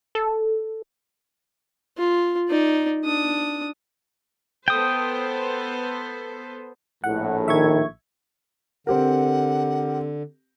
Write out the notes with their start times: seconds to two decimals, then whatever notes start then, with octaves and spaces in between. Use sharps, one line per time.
0.15 A4
1.98 F4
2.49 D#4 D5
3.04 D4 D#6
4.68 B3 A4 C5 G5 D#6
7.04 A#1 A2 F#5
7.48 D#3 E5 C#6 G#6
8.87 D3 C4 G4 A#4 F#5